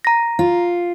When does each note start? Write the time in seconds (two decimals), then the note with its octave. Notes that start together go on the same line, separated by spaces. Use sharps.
0.05 A#5 A#6
0.39 F4